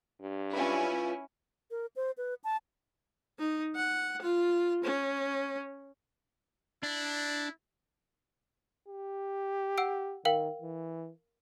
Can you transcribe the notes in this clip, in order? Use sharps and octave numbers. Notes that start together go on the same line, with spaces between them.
G2
C#4 E4 F4 B4
A#4
C5
B4
A5
D#4
F#5
F4
C#4
D4 E4
G4
F#5 E6 D7
D#3 A#4 F5 G5
E3